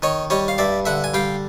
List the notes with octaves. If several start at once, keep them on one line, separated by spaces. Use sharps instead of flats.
D#3 C#5 D#5
G3 C#5 D#5
F5
G2 D5 E5
D3 E5 F#5
G#5
G3 F5 G5